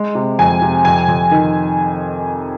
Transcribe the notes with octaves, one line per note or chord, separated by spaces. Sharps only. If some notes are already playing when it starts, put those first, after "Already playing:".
Already playing: G#3
C3
F2 G#5
C3
F2 G#5
F2
D#3